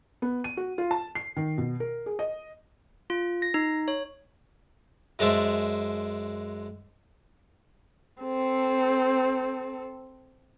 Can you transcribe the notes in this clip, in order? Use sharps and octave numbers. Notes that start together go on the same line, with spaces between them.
B3
D#7
F#4
F4
A5
C7
D#3
B2
A#4
G#4
D#5
F4
A#6
D#4
C#5
F#2 G#3 D4 C5 E5
C4 A4